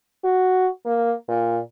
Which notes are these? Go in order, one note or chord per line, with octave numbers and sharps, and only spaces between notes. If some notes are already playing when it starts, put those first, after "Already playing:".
F#4
A#3
A#2